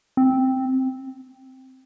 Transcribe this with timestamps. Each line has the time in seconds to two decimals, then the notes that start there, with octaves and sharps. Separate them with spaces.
0.17 C4